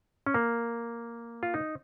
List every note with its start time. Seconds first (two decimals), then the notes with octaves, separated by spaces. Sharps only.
0.26 C#4
0.34 A#3
1.43 F4
1.54 D#4